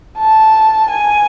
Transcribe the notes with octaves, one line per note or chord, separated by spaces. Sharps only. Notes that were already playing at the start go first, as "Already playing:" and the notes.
A5
G#5